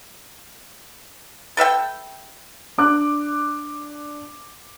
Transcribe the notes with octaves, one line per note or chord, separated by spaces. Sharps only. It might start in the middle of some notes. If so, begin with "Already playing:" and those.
A4 B4 E5 G5
D4 D6 F#6